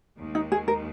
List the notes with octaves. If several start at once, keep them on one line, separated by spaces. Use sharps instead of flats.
D#2 D#3 G#3
D#4
G#4
A#4